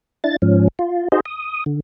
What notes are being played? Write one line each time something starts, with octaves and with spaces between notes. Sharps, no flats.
D4 E4 A6
G#2 F3 C#4
F4
D#4 F#4 G#4 C5 D#5
D#6
D3